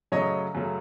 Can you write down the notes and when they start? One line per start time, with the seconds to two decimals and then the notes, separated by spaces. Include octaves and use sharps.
0.12 F#2 C#3 F#3 A3 C#5 D#5
0.55 F#2 C#3 F#3 A3